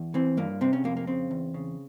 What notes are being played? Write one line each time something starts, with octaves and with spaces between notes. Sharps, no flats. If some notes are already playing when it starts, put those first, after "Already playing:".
Already playing: E2
E3 C4
G2 A#3
C3 C4
C#4
F2 A#3
A#3
C#3 C4
E2
C#3